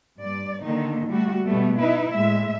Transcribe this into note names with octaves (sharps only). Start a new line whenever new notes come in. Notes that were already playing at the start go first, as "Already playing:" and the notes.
G2 D5
D3 D#3 A#3 D#4
G3 A3 F#4
B2 G3 A3 B3
D#4 E4 B4
A2 G#3 E5